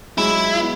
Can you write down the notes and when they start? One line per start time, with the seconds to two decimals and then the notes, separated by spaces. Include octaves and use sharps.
0.18 F#3 G#3 E4
0.58 B3